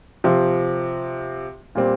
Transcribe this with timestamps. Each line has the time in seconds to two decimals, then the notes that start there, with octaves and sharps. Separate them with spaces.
0.24 C3 F3 C4
1.75 A#2 G3 C4